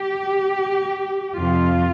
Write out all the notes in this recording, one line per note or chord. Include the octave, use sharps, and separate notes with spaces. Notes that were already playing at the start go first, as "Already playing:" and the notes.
Already playing: G4
F2 C3 F3 F4